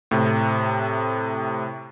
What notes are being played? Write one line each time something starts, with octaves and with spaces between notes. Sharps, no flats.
A2 C3